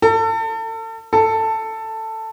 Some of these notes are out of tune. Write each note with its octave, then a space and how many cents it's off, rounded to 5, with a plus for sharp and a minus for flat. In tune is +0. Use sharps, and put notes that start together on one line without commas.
A4 +35
A4 +10